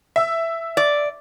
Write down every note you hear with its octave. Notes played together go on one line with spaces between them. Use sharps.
E5
D5